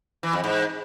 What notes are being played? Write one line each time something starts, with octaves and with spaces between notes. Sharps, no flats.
E3
F2
G#2